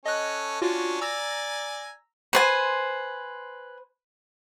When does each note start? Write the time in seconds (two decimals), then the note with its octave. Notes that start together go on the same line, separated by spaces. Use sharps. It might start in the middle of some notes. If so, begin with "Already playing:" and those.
0.06 C#4 A4 D#5 F#6
0.62 C#4 D4 F4 F#4
1.01 D5 G#5 A#5 E6 A#6
2.33 B4 C5 G#5